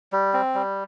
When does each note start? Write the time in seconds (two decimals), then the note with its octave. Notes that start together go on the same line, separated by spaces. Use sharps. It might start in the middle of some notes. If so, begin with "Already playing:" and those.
0.13 G3
0.33 C4
0.55 G3